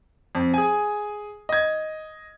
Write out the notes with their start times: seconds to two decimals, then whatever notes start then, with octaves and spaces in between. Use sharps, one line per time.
0.35 F2
0.54 G#4 G#5
1.49 D#5 G#6